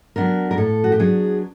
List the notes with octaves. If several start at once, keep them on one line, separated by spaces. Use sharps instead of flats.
F#3 B3 D4 A#4
A#4
A2 A4
F#4
G4
F#3 B3 D4 G#4